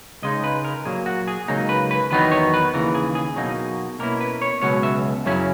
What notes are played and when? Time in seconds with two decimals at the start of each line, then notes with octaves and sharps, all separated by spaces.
0.22 C#2 C#3 G#3 D#4 D#5
0.44 B4
0.64 A#4
0.85 A#2 F#3 A#3 G#4
1.06 F#4
1.28 G#4
1.48 C#2 C#3 F#3 A#3 D#4
1.69 B4
1.91 B4
2.11 E2 D#3 F#3 B3 D#4 B4
2.32 C#5
2.54 B4
2.74 D#2 C#3 E3 A#4
2.95 G#4
3.15 G#4
3.36 B2 F#3 A#3 D#4
3.99 B2 A#3 C#4 E4 A#4
4.21 B4
4.42 C#5
4.62 C#2 B2 F#3 C#4 C#5
4.83 E5
5.25 F#2 C#3 F#3 C#4 E4